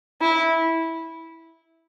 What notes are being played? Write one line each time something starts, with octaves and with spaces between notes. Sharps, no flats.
E4